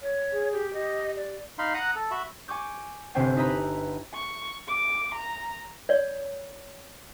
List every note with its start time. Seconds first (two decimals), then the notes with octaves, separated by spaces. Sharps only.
0.02 C#5
0.32 G#4
0.52 G4
0.74 G4 D#5
1.16 D5
1.59 D#4 F5 B5 C6
1.74 F#5 A#5 D#6 F#6
1.96 A4
2.11 F#4 E5 B5
2.48 G#5 C#6 D6 G6
3.15 G1 C3 C4 C5 G5 G#5
3.36 D#4 E4 B4 D#5 A#5 B5
4.14 C#6
4.68 D6
5.15 A#5
5.89 C#5 D5